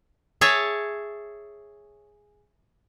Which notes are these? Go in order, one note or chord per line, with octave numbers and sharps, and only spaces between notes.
G#4 C#5 E5 A5